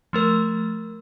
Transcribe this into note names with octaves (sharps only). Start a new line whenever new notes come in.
F3 A3 A#4